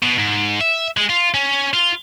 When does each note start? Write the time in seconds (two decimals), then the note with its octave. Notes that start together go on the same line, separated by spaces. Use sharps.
0.02 B2
0.18 G#2
0.61 E5
0.97 G#3
1.09 F4
1.34 C#4
1.74 F4